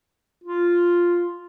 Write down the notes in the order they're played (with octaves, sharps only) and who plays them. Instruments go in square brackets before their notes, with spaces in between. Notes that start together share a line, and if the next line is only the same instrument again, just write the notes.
[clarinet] F4